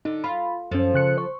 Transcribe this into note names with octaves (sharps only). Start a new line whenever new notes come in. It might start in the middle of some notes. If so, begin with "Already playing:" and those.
D3 D#4
F4 B5
F#2 F3 C#4 A4
C#3 F#6 C#7
C5 C#6